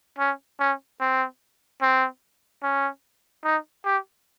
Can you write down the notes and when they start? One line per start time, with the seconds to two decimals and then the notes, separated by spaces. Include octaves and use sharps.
0.19 C#4
0.60 C#4
1.00 C4
1.82 C4
2.63 C#4
3.44 D#4
3.85 G4